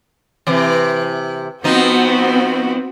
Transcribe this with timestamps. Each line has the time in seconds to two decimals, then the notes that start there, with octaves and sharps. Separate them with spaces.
0.47 C3 E3
1.64 F3 B3 C4 D#4 F#4